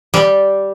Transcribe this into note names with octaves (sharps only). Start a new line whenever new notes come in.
G3